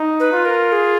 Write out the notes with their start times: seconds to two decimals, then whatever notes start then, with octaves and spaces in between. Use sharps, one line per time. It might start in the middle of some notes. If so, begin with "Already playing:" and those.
Already playing: D#4
0.20 B4
0.32 F4
0.46 A#4
0.72 G#4